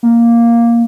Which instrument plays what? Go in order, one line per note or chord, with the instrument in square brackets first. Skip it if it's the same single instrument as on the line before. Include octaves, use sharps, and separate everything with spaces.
[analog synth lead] A#3